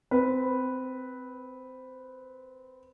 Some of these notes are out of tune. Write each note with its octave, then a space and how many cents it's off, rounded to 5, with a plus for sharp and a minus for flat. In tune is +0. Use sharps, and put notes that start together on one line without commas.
C4 -20 B4 +0